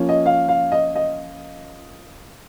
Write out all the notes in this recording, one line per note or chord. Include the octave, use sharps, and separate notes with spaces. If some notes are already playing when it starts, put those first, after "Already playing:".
Already playing: F3 A#3 C#4 F4
D#5
F5
F5
D#5
D#5